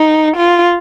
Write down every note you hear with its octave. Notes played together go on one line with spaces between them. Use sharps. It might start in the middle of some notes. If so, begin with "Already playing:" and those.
Already playing: D#4
F4